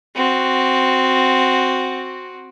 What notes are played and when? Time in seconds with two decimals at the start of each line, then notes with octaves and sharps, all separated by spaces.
0.15 C4 F#4